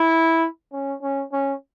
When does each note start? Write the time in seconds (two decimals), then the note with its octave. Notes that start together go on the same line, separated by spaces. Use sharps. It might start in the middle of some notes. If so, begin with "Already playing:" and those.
Already playing: E4
0.73 C#4
1.02 C#4
1.32 C#4